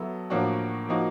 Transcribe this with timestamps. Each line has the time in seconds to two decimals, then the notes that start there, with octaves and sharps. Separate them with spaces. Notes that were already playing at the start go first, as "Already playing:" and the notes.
Already playing: F#3 B3 E4 A4
0.30 A2 F3 A#3 D4 F#4
0.89 F3 A#3 D#4 F#4